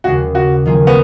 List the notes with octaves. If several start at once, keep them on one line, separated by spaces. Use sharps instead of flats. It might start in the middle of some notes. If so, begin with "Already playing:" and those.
D#2 C#3 G#3 F#4
F#4
D#3 F#3 A#3 F4 G#4
B3